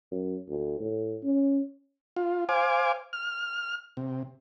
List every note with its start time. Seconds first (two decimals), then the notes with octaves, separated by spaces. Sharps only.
0.11 F#2
0.49 D2
0.80 A2
1.23 C#4
2.16 F4
2.49 C5 F5 G#5 D6
3.13 F6
3.97 C3